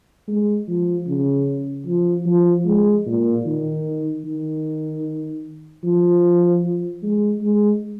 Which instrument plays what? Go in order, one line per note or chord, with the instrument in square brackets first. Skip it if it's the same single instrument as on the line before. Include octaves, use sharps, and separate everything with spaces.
[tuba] G#3
F3
C#3
F3
F3
G#3
A#2
D#3
D#3
F3
G#3
G#3